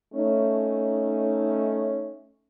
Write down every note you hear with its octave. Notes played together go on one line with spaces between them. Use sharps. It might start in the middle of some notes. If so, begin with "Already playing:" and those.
A3 C#4 D#4